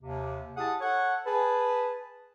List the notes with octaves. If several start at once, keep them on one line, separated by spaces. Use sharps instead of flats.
D#2 C3
E4 G4 G#4 F#5 A5 D#6
A4 C#5 F#5
G#4 B4 A5